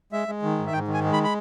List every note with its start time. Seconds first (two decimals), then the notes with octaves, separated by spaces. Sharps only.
0.12 G#3 E5
0.28 G#3
0.43 D#3
0.58 G#2
0.67 E5
0.73 G#2 G5
0.88 D#3
0.94 G#5
1.04 G#3
1.13 B5
1.24 B5